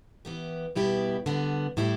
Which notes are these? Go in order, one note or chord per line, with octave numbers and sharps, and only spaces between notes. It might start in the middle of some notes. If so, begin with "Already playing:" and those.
E3 B3 G4
B2 G3 B3 E4 G4
D3 G3 B3
A2 G3 E4 G4